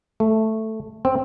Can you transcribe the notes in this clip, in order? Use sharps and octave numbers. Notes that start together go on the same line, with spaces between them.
A3
C4